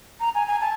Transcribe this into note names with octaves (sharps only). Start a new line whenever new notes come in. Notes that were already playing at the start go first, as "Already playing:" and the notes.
A#5
G#5
G#5
A5